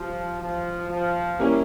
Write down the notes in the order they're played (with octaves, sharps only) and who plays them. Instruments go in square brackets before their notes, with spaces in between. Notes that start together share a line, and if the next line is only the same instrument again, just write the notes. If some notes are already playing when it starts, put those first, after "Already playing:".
Already playing: [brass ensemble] F3 [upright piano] G3
[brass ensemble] F3
F3
[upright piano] G3 A#3 C#4 E4